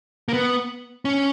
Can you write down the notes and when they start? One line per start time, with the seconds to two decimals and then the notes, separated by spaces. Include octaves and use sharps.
0.28 A#3
0.33 B3
1.05 C#4